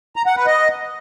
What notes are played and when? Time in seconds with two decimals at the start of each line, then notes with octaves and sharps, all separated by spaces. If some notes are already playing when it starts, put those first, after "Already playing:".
0.16 A#5
0.26 F#5
0.36 B4
0.46 D#5